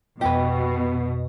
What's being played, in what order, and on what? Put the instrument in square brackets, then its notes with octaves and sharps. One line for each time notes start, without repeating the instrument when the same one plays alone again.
[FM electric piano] F2 D#5 [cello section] B2 [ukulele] G4 B4